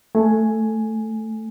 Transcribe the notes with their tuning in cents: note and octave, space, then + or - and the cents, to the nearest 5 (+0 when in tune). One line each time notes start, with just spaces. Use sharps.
A3 +0 G#5 +5